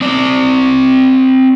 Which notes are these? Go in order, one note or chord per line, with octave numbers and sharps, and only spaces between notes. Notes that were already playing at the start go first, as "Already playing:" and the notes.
C4 D5